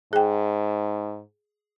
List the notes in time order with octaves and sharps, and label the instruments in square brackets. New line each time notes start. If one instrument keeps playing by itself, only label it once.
[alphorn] G#2 [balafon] G#4 G5